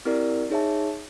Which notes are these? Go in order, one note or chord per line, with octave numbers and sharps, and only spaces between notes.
C4 E4 G4 A#4 D5
D#4 G#4 C#5 E5 A5